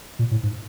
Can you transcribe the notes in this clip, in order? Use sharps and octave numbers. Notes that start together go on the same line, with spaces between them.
A#2
A2
G#2